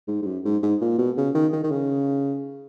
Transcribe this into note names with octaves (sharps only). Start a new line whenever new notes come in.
G#2
G#2
F#2
G#2
G#2
A#2
B2
C#3
D#3
D#3
D#3
C#3